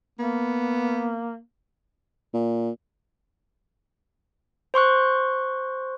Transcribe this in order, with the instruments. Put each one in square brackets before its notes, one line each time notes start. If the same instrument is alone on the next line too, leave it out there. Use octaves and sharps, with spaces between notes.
[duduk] A#3 [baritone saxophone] B3
[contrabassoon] A#2
[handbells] C5 C6 C#6 F#6